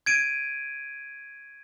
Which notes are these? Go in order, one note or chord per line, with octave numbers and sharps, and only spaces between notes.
G#6 D7 D#7